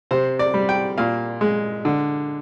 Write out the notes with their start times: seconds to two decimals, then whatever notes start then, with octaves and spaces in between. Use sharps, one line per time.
0.11 C3 C5
0.39 D5
0.54 G3
0.69 G5
0.98 A#2 F5
1.41 G#3
1.85 D3